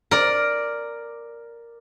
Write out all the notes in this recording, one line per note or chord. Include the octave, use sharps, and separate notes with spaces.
A#4 D5